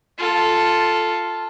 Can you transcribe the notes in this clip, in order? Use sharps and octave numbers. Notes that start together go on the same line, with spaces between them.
F4 A4